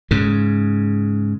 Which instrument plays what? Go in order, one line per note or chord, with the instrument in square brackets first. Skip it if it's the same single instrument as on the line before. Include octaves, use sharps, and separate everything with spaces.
[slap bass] G#2 C#3